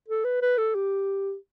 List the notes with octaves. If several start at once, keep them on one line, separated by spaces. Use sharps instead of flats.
A4
B4
B4
A4
G4